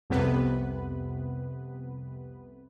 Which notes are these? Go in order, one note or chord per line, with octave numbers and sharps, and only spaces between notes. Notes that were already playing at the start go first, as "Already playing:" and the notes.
C2 F2 C3 B3 B4